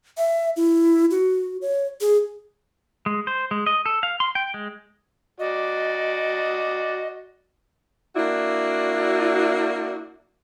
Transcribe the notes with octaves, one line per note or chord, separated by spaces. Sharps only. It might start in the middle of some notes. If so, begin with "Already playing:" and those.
E5
E4
F#4
C#5
G#4
G#3
C5
G#3
D#5
A4
F5
C6
G5
G#3
F#4 D5 D#5
A#3 D4 E4 F#4